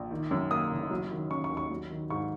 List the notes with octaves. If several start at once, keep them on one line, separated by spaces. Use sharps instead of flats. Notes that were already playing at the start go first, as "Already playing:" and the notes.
Already playing: A#1
D#3
F#2
A#3 D#6
F#1
F#3
D#3
C#4 C#6
C#6
D#2
C#6
F#3
D#3
G#2 C#6